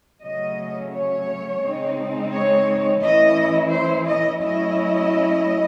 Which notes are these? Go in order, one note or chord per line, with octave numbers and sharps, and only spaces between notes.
C#3 F#3 A3 C#4 D#5
C#5
C#3 G#3 C4 D#4
C#5
E3 A3 C#4 E4 D#5
C5
D#5
F#3 A3 C#4 E4 D#5